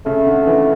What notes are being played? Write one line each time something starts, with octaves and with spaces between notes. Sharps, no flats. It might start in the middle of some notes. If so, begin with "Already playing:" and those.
C#3 A3
D3
E3